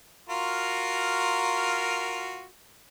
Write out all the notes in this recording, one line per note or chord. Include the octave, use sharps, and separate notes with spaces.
F4 F#4 A#4